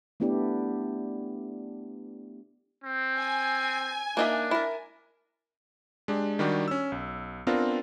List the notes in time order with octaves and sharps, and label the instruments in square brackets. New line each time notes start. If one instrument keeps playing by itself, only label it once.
[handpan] A3 B3 D4 E4 G4 D5
[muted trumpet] C4
[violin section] G#5
[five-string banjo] A#3 D#4 E5 [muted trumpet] D4
[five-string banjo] E4 A#4
[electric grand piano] G#3 D4 G4
D#3 G3 D4 F#4 G4
C#4 E6
B1
B3 C4 D4 F4 A#4